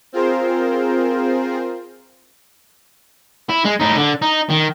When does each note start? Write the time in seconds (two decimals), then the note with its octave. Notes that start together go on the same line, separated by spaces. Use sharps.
0.12 C4 F4 G#4 A#4 C5
3.49 E4
3.64 G#3
3.80 A2 D#4
3.96 D3
4.22 D#4
4.50 D#3